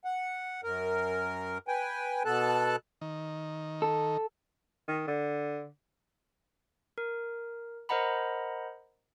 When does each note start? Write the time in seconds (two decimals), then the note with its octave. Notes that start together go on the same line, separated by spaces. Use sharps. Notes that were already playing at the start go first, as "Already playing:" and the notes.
0.05 F#5
0.64 F#2 A#4
1.68 B4 G5 G#5
2.25 B2 B3 A4 A5 F#6
3.01 D#3
3.82 A4
4.88 D#3
5.07 D3
6.98 A#4
7.89 A#4 C5 D#5 F#5 A#5 B5